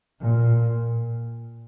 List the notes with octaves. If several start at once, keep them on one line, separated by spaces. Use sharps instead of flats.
A#2